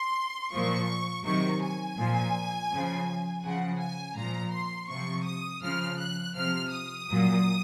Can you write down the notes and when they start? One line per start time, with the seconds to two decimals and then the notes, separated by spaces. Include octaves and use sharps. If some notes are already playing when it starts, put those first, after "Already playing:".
Already playing: C6
0.52 A#2 F3 C#6
1.24 C3 D#3 F#3 C#6
1.61 G#5
1.97 A#2 F3
2.71 C#3 F3
3.44 C#3 F3 F#5
3.80 G#5
4.16 A#2 F3 A#5
4.53 C6
4.89 C3 F3 C#6
5.26 D#6
5.62 C#3 F3 F6
5.98 F#6
6.35 C3 F3 F6
6.72 D#6
7.09 A#2 F#3